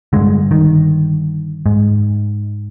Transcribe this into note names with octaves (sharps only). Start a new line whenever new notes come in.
G2 D3 G#3
D#3
G#2